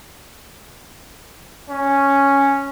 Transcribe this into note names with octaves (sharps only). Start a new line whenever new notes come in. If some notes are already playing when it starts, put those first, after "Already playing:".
C#4